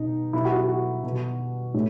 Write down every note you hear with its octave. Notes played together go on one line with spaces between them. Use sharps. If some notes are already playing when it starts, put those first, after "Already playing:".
Already playing: B2 D#4
B2 E4
F#4
F#4
F#4
B2
A2